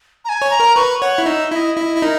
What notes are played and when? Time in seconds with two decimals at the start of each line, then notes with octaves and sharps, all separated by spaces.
0.25 A#5
0.29 G#5
0.42 C#5
0.50 A#5
0.60 A#4
0.76 B4 C#6
1.01 C#5 F#5
1.18 E4
1.26 D#4 E5
1.52 E4 E5
1.56 D#5
1.77 E4 E5
1.82 D#5
1.96 E4
2.02 D#4 A#4